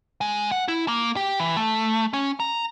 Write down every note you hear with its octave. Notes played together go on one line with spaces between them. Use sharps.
G#3
F#5
E4
A#3
G4
E3
A3
C#4
A#5